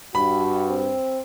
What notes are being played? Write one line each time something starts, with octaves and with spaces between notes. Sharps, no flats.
G2 F#4 B5
C4